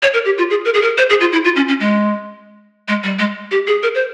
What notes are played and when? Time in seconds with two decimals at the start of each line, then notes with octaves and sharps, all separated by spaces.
0.03 C#5
0.14 A#4
0.25 G4
0.38 F4
0.50 G#4
0.65 A#4
0.74 G#4
0.82 A#4
0.98 C5
1.10 G#4
1.20 F4
1.33 E4
1.44 F4
1.56 C#4
1.68 C#4
1.80 G#3
2.88 G#3
3.04 G3
3.19 G#3
3.51 G4
3.67 G#4
3.83 A#4
3.95 C5